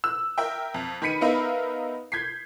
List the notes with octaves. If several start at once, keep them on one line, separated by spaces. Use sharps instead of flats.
E6 F#6
A#4 E5 G5
F2
D#3 B4 B5 B6 C#7 D#7
B3 D#4 A#4 E5 F5 B5
G6 G#6 B6 C7